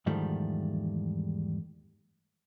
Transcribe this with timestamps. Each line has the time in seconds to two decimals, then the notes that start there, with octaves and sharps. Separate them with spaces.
0.06 E2 G#2 D#3 F3 G3 A3